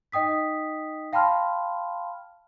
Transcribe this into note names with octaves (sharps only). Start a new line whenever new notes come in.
D#4 D#5 G5 D#6 B6
F5 G5 A5 B5 C6 F6